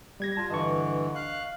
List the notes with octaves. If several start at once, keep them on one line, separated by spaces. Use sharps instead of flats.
G3 G#6 A#6
F4 A5
G2 D3 E3 D#5 C#6
F5 F#6